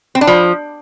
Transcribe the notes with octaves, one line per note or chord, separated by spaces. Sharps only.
C4
D4
F3